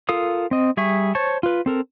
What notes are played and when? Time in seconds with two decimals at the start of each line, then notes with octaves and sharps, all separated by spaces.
0.09 F4 A4 A#4 F5 D#6
0.51 C4 D#5
0.77 G3 G#4 E5 C#6
1.15 C5 C#5 A5 C#6
1.43 F4 B4
1.66 C4 A4 A#4